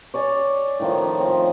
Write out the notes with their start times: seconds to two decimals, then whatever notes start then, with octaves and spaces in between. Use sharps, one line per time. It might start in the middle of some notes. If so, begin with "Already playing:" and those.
0.14 C#5 D5 G#5
0.80 A2 D#3 F3
1.20 F3 C4